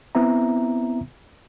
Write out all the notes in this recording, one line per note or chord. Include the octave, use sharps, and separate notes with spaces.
B3 C4 E4 E5 A#5